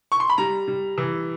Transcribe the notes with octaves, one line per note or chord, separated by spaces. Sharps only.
C#6
C6
B5
G3 A#5
G3
E3